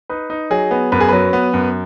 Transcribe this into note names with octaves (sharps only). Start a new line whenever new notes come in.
D#4 B4
D#4
F#3 G#4
B3
F#2 B4
G#4
F#3 B4
B3
F#2